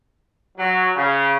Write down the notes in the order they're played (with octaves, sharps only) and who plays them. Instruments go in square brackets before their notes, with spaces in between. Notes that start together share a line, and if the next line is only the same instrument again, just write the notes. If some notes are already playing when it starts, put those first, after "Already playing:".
[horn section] F#3
C#3